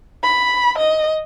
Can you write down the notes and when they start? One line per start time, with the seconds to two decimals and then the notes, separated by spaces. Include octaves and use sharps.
0.24 B5
0.78 D#5